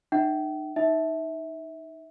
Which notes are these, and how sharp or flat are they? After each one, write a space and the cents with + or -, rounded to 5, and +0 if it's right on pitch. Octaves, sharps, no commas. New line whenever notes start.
D#4 -40 E5 +0 G5 -40
D#4 +0 E5 -20